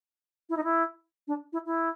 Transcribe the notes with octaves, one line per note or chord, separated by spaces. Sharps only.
E4
D#4
E4
D4
E4
E4